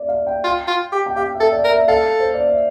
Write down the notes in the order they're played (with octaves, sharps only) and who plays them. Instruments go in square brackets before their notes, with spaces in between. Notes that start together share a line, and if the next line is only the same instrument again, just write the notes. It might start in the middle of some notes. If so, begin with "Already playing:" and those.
Already playing: [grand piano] D5 E5
F5
G5
[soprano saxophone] F4
F4
G4
[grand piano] G5
[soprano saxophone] G4 [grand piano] F5
[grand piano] E5
[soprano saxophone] A4
[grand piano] D5
[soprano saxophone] A#4
[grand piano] E5
[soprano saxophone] A4 [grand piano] F5
[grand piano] C5
D5
E5